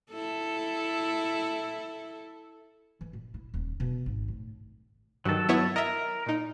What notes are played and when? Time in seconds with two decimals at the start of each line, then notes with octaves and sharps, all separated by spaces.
0.11 E4 A4
3.01 E3
3.13 A#2
3.34 E4
3.54 D#1
3.80 B2
4.06 G#1
4.28 A2
5.25 G2 D#3 F#3 A4
5.49 B3 E4 C#5
5.76 A#4 D#5 E5
6.26 A#2 D#4